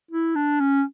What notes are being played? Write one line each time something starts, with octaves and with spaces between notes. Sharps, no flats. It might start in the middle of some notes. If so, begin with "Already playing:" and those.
E4
D4
C#4